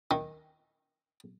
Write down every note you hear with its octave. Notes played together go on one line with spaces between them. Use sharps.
D#3